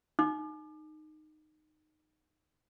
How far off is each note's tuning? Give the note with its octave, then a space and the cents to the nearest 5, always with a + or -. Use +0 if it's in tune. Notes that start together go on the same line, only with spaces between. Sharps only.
D#4 -15 D6 +35